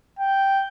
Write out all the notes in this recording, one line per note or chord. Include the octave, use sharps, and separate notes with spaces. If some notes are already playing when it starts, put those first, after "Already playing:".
G5